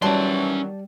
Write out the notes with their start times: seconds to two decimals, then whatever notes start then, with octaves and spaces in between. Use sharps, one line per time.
0.02 D#3 E3 F#3 G3 C#4 D5 A5 C6